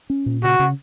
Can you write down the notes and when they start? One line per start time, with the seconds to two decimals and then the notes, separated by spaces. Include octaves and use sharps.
0.10 C#4
0.26 A#2
0.43 C#3 F#4
0.59 C#3